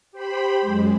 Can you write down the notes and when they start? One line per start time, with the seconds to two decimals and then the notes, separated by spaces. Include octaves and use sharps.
0.12 G4 C5 B5
0.61 F#2 G#3